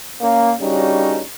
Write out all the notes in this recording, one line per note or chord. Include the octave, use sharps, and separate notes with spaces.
A#3 C#4
G2 C#3 G3 C#4 D#4 F#4